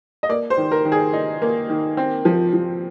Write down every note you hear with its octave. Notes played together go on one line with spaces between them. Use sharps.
D#5
A#3 D5
C5
D#3
A#4
D#3
G#4
D#4
A#3
D#3
C4
F3
F3